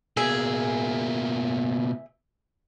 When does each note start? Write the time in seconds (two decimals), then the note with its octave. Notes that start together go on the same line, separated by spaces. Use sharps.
0.17 B2 A#3 G#4 E5